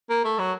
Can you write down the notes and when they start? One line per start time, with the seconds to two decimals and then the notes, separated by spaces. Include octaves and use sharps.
0.10 A#3
0.25 A3
0.39 F#3